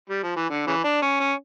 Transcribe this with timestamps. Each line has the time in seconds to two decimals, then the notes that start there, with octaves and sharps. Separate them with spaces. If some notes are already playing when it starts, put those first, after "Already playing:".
0.10 G3
0.23 F3
0.36 E3
0.50 D3
0.67 C#3 E3
0.84 D4
1.02 C#4
1.20 C#4